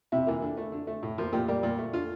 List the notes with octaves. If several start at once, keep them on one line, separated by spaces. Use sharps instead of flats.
C3 E4
E3 A#3
D3
A3
D3
A3
A2
F3 A#3
A#2 G4
G3 A#3
A#2
A3
D3 F4